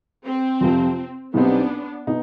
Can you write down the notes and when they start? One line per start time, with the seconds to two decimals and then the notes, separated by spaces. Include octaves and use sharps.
0.25 C4
0.61 F2 C3 F3
1.34 B1 B2 G3 B3 C4 D4 D#4
2.07 B2 D#4